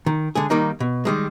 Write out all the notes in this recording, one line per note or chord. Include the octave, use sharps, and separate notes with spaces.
D#3
D3 G#3 G#4
D#3 G3 A#3 D#4
B2
D#3 G3 G#3